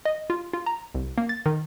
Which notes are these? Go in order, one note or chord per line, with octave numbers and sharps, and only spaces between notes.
D#5
F4
F4
A#5
C2
A#3
A6
D#3